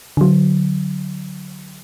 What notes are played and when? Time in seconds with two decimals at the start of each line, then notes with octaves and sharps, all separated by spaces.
0.17 D3 F#3